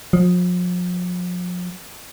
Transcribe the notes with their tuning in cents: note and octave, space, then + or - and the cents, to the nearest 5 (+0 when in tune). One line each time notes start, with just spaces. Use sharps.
F3 +40